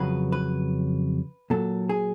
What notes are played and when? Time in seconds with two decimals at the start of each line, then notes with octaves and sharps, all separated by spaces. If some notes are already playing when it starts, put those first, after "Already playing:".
Already playing: F2 C#3 F#3 B4
0.32 B4
1.50 A#2 F#3 A4
1.89 G#4